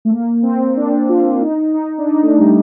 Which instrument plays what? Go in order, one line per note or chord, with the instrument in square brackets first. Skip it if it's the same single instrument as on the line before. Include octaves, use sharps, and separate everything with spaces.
[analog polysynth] A3
A#3
C4
D4
F4
D#4
D#4
D4
D#4
A3
G3